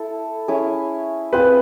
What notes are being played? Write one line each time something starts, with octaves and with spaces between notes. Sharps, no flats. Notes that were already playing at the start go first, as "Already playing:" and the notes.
Already playing: E4 A4
C#4 E4 G#4
C4 F4 G#4 B4 C5